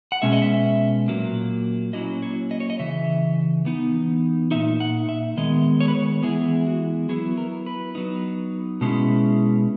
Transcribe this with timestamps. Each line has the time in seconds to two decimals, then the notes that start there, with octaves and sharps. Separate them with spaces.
0.12 F#5
0.22 B2 G#3 C#4 E5
0.33 D#5
0.42 E5
1.08 A#2 F#3 A#3
1.93 F#3 A#3 C#4 E4 D#5
2.22 C#5
2.51 D#5
2.60 C#5
2.70 D#5
2.79 C#3 E3 E5
3.65 E3 B3 D#4
4.51 A#2 G#3 D#4 E5
4.80 F#5
5.09 E5
5.37 D#3 G#3 B3 D#5
5.80 C#5
5.88 B4
5.95 C#5
6.23 E3 G#3 B3 E4 G#4
6.67 F#4
7.09 F#3 B3 E4 G#4
7.37 A#4
7.66 B4
7.95 F#3 B3 D#4
8.81 B2 G#3 C#4 E4